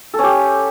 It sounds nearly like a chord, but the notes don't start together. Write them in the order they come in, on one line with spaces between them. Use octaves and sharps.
A4 C#4 G4